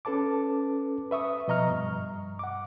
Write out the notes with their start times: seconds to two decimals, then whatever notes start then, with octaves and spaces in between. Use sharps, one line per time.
0.05 C#4 A4 B4 A5 D6
1.11 B4 E5 C#6 D#6
1.48 B2 F3 D#5 A#5 C#6 F6
1.70 G2
2.39 F#5 D6